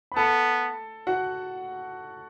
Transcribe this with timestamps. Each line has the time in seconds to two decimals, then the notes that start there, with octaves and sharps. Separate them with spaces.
0.12 B5
0.16 B3 A4 A5
1.07 F#4 F#5